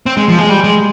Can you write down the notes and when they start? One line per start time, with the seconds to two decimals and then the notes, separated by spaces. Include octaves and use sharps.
0.06 C4
0.17 G#3
0.28 F3
0.39 G#3
0.49 G3
0.64 G#3